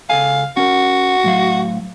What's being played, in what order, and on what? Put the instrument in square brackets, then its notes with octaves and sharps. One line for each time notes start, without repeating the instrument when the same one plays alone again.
[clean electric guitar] C#2 A4 G#5 [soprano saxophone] F5
[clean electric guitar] C#4 A#4 [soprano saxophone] F#4
[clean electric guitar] A2 F#3 F5